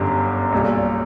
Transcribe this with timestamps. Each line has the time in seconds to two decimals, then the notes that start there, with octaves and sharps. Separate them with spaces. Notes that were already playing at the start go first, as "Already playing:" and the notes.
Already playing: G1 F#2 D3 G4
0.52 B1 A#2 G3